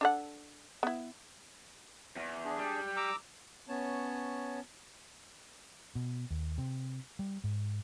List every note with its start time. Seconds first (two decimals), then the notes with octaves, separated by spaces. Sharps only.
0.01 D4 A4 F#5
0.83 B3 E4
2.17 E2
2.45 D4 G#4
2.58 G3
2.96 A#5 D6 E6
3.69 B3 C#4 C#5 A5
5.95 B2
6.30 D#2
6.58 C3
7.19 G3
7.44 G#2